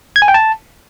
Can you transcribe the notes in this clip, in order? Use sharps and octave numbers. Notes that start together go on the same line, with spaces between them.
G#6
G#5
G5
A5